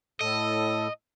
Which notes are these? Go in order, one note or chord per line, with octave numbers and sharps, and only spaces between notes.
A2 A4 D#5